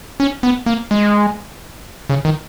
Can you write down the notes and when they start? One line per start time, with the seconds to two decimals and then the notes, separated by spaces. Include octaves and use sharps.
0.20 C#4
0.43 B3
0.66 A#3
0.91 G#3
2.10 C#3
2.25 D#3